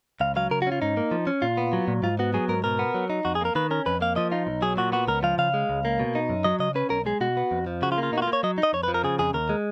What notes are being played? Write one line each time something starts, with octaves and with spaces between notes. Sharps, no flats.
C#2 F5
F#3 F5
C#3 A#4
F#4
C#4 F4
G#2 D#4
A#3
F3
C#4
A#2 F4
B3
F#3
A#2
G#2 F4
B3 F#4
F#3 G#4
G#2 A#4
B2 A#4
B3
F#3
D#4
F2 F#4
G#4
A#3 A#4
D#3 B4
C#4 A#4
F2 B4
A#3 F5
F3 D#5
D#4 F4
B1
F#3 G#4
A#2 F#4
B3 F#4
C#2 A#4
F3 F5
C#3 F5
G#3
C#2
A#3
B2
D#4
F#2
F#3 D#5
C#3 D#5
C#4 B4
B1 A#4
G#3 G#4
B2 F#4
B3
F2
F3
C#3 F#4
F4
A#3
F4
B2 D#4
F#4
F4
A#3
C#5
F#3 D#5
D#4
D#5
F2 C#5
B4
F3
A#4
C#3 G#4
F2 G#4
D#2 A#4
G#3